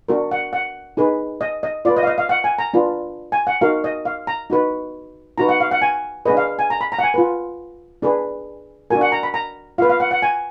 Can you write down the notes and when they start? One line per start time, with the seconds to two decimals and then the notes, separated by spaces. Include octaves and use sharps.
0.08 D4 F#4 A#4
0.31 F#5
0.53 F#5
0.97 D#4 G#4 B4
1.41 D#5
1.63 D#5
1.85 F4 B4 D5
1.97 D#5
2.03 F5
2.07 D#5
2.18 F5
2.29 F#5
2.44 G#5
2.59 A#5
2.74 D4 F4 B4
3.32 G#5
3.47 F#5
3.61 D#4 F#4 A#4 F5
3.84 D#5
4.05 F5
4.27 A#5
4.50 D#4 F#4 B4
5.38 D#4 F#4 B4 A#5
5.49 F#5
5.60 F5
5.71 F#5
5.82 G#5
6.26 D4 G#4 B4 D#5
6.37 F5
6.59 G#5
6.70 A#5
6.81 B5
6.92 A#5
6.99 F#5
7.03 G#5
7.14 F4 B4
8.02 D4 G#4 B4
8.90 D4 F#4 A#4 G#5
9.01 F#5
9.12 A#5
9.23 B5
9.34 A#5
9.78 F4 F5
9.82 B4
9.90 F5
10.00 F#5
10.11 F#5
10.22 G#5